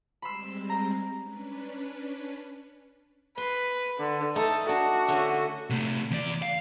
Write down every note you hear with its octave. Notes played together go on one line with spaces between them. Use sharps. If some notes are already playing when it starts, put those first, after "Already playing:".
G3 G#3 C4 B5 C6 E6
A#5
C#4 D4 B4
B4 C6
D3
A3 D#4 A4
D4 F#4
D3 C#4 E5
C3 A3
E2 D5
F5